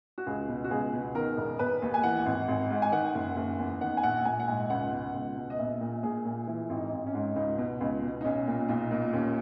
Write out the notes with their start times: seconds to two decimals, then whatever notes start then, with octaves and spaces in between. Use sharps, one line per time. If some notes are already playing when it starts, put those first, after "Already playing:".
0.18 F#4
0.27 C#2 G#4
0.49 B2
0.64 F#4
0.71 C#2 G#4
0.93 B2
1.15 D#3 A#4
1.37 E1
1.59 E1 B4
1.82 D#2
1.94 G#5
2.03 E3 F#5
2.26 G#1
2.48 G#1
2.71 G#2
2.82 G#5
2.92 D#3 F#5
3.15 F#1
3.36 F#1
3.59 E2
3.81 D#3 F#5
3.97 G#5
4.03 A#1 F#5
4.25 A#1 G#5
4.39 F#5
4.48 G#2 G#5
4.70 C#2 F#5
4.92 B2
5.14 C#2
5.37 B2
5.50 D#5
5.59 A#1 E5
5.81 A#2
6.03 A#1 G#4
6.25 A#2
6.47 E3 E4
6.70 G#1
6.77 D#4
6.92 G#1
7.07 C#4
7.14 G#2
7.36 C#2 D#4
7.58 B2
7.81 C#2
8.03 B2
8.21 D#4
8.24 B1 C#4
8.47 A#2
8.68 B1 D#4
8.91 A#2
9.13 D#2 C#4